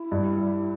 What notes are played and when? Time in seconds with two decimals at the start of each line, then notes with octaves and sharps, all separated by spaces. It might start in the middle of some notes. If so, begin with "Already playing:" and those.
Already playing: E4
0.12 G2
0.37 G3